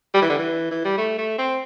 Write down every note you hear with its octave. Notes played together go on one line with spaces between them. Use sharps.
G3
E3
D3
E3
E3
G3
A3
A3
C4